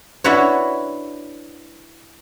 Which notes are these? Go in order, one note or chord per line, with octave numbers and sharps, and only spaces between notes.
D4 E4 F#4 B4 C#5